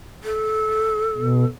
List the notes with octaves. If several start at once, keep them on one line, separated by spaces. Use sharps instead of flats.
A4
B2